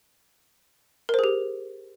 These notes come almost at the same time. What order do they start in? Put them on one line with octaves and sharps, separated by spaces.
A#4 C5 G#4 G4